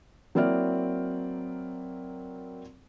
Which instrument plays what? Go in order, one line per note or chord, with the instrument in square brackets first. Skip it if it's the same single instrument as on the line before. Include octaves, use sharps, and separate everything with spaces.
[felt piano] F#3 A#3 C4 E4 D5 F6